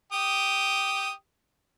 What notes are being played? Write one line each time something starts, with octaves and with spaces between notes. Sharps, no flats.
G4 G5 D#6